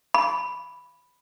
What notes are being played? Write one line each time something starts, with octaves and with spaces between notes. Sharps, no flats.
B5